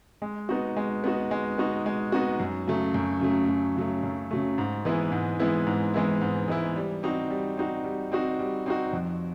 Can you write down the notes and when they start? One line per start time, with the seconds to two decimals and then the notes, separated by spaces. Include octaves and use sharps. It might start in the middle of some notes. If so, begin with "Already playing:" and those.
0.22 G#3
0.49 B3 D#4 F#4
0.77 G#3
1.04 B3 D#4 F#4
1.31 G#3
1.58 B3 D#4 F#4
1.86 G#3
2.12 B3 D#4 F#4
2.40 F#2
2.67 C#3 F#3 A3
2.94 F#2
3.21 C#3 F#3 A3
3.48 F#2
3.76 C#3 F#3 A3
4.03 F#2
4.31 C#3 F#3 A3
4.58 G#2
4.85 E3 G#3 B3 E4
5.12 G#2
5.40 E3 G#3 B3 E4
5.67 G#2
5.94 E3 G#3 B3 E4
6.21 G#2
6.48 E3 G#3 B3 E4
6.76 G3
7.03 C4 D#4 F#4
7.30 G3
7.57 C4 D#4 F#4
7.84 G3
8.12 C4 D#4 F#4
8.39 G3
8.66 C4 D#4 F#4
8.93 F2